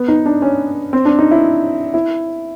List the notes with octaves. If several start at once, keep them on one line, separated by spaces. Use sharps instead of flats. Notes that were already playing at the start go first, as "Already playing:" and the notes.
Already playing: B3
D#4
D4
C#4
C4
D4
D#4
E4
E4